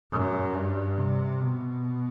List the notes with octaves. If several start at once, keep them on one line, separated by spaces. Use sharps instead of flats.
F#2
G2
C3
B2